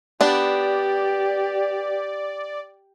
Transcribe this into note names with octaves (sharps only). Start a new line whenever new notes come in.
B3 D4 G4 D5